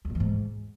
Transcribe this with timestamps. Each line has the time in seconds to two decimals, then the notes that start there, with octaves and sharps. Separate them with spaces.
0.05 E2
0.10 A2
0.15 E3
0.20 G#2